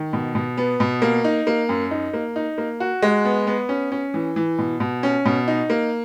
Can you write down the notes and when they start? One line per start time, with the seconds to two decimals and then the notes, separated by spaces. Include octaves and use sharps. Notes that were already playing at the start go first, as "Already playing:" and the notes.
Already playing: D#3
0.13 B2
0.35 B2
0.57 B3
0.80 B2
1.02 A#3
1.24 D#4
1.47 A#3
1.69 F#2
1.91 D#4
2.13 A#3
2.36 D#4
2.58 A#3
2.80 F#4
3.02 G#3
3.25 B3
3.47 B3
3.69 C#4
3.92 C#4
4.14 E3
4.36 E3
4.59 B2
4.80 B2
5.03 C#4
5.25 B2
5.48 D#4
5.70 A#3